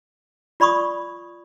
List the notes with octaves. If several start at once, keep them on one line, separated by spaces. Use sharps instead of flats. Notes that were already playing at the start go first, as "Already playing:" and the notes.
F4 D5 B5 C#6 D#6